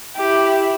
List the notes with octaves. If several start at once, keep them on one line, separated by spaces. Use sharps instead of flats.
E4 G4